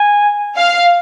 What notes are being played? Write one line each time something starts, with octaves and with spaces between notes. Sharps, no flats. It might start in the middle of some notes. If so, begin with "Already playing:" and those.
Already playing: G#5
F5